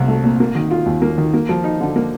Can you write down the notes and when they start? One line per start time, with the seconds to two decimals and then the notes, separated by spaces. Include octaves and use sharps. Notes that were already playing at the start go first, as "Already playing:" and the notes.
Already playing: C2 A#2 C4
0.08 A3
0.23 A#2
0.40 A#3
0.55 D#3
0.71 F4
0.86 D#2
1.02 A#3
1.18 D#3
1.34 A#3
1.49 F3
1.64 D#4
1.81 D3
1.96 A#3